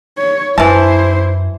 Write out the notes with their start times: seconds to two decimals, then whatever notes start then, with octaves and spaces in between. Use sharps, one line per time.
0.18 C#5
0.58 F#2 E3 E4 C5 A5